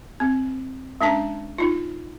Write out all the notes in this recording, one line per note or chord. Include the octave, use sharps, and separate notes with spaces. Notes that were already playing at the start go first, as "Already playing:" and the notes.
C4
G#3 C#4 D4 A5
D#4 F4